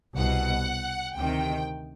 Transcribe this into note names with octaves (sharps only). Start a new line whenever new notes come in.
C2 B2 F#5
D2 C3 D#3 G5